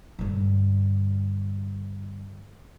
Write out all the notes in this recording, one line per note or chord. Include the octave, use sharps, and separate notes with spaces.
G2 D3